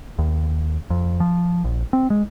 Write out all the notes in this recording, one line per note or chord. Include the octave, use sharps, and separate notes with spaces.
D#2
F2
F3
A#1
C4
G#3